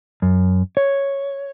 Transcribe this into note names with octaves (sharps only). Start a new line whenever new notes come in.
F#2
C#5